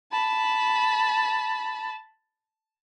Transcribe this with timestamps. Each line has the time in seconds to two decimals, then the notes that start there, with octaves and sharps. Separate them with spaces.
0.12 A5 B5